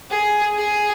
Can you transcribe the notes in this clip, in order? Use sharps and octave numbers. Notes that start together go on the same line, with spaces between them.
G#4
G#4